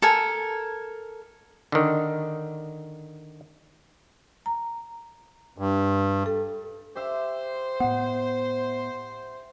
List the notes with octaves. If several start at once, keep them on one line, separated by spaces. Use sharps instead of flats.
A4 A#4 G#5
D3 D#3
A#5
G2
A4
G4 C5 E5 F5
A2 B3 F#5